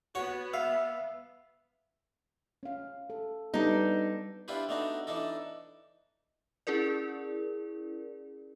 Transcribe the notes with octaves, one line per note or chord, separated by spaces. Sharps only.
B3 F#4 C#5
E5 F5
C#4 F5
A4
G3 B3 D4 D#4 A4
D4 E4 F4 G4 B4 C5
A3 B3 D4 D#4 F#4
E3 D4 D#4 A4
C#4 E4 G#4 A#4 D5